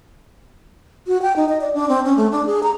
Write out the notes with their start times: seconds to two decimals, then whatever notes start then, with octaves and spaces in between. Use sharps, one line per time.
1.07 F#4
1.22 G5
1.36 D#4
1.49 D#5
1.61 D5
1.74 D4
1.89 C4
2.05 C#4
2.17 A3
2.32 D4
2.47 G#4
2.63 A#5